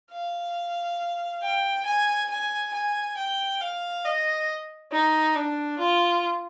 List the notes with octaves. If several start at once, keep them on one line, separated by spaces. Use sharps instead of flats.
F5
G5
G#5
G#5
G#5
G5
F5
D#5
D#4
D4
F4